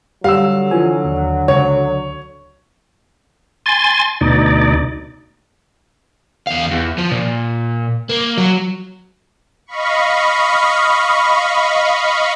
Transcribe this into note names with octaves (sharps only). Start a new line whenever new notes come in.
D3 F#3 G3 F5 E6
E3 F3 G#5
D#2
C#2 C#5
G#5 C6 A6
D2 B2 D#4 D5
E2 F5
E2
F3
A#2
A#3
F#3
D#5 F5 B5 C#6